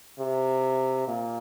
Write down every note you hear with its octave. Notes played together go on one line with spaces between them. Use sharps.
C3
A#2